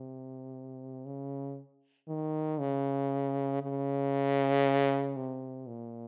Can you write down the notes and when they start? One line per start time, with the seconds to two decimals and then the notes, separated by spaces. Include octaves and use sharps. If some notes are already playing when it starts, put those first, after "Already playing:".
Already playing: C3
1.06 C#3
2.08 D#3
2.60 C#3
3.63 C#3
5.16 C3
5.67 A#2